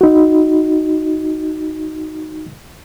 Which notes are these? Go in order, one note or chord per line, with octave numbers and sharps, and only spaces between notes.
D#4 F#4